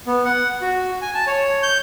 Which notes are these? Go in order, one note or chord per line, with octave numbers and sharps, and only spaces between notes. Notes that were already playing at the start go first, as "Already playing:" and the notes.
B3
F#5
F#4
G#5
A5
C#5
G6